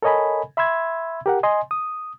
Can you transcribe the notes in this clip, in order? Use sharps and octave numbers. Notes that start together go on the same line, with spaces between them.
A4 A#4 C#5 D#5 G#5 B5
E5 B5 C6 E6 G#6
G4 A#4 F#5
D#5 G#5 C6
D#6